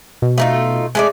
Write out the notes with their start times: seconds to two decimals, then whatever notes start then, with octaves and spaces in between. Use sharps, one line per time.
0.22 B2
0.38 A3 D#4 F4
0.95 G#3 A3 D5